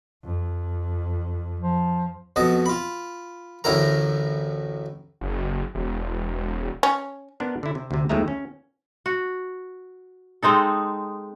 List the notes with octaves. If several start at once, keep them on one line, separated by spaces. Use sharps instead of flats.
F2
F3
F2 B2 D#5 A5
F4 B5
A1 D2 A2 E4 A#4 A#5
F#1
E1
C#4
B3 D4 A#4 C5
D3 E4
C3
D2 C3
D#2 F3 G#3 A3 E5 A#5
C#4
F#4
G#3 C4 D#4 A4